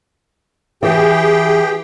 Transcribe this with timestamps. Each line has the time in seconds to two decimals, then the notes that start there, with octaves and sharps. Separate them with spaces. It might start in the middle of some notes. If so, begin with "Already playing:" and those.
0.83 E3 G4 G#4 G5